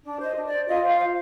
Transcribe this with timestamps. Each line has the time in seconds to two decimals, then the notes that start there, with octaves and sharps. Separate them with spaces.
0.03 D4
0.18 C5
0.23 D#5
0.35 D4
0.45 D5
0.50 C5
0.66 F4 D#5
0.83 C5 F5
0.98 C5